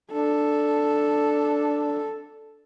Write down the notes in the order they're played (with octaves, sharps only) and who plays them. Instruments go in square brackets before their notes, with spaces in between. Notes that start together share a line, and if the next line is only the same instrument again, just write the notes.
[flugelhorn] D4 [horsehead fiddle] A4